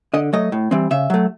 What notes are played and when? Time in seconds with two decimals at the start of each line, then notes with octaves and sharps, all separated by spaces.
0.14 D3 D#5
0.33 F#3 A3 D#5
0.52 A2
0.71 E3 G3 C4
0.91 C#3 E5
1.10 F#3 A3